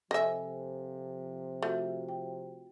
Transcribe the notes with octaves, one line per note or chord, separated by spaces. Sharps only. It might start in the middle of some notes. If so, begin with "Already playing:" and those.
C3 F3 A4 D#5 E5 G#5
A3 F4 F#4
G5